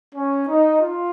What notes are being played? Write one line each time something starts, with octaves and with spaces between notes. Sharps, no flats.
C#4
D#4
F4